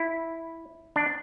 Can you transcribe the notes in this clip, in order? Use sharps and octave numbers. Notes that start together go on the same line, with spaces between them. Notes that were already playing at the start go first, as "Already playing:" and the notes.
Already playing: E4
D4